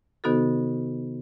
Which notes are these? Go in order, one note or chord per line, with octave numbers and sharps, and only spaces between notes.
C3 D#3 B3 D#4 F#4 A4